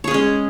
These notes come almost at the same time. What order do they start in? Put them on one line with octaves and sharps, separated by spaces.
C#5 G#4 C#4 G#3